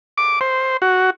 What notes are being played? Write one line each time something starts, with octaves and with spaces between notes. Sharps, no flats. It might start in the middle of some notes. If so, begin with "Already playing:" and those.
D6
C5
F#4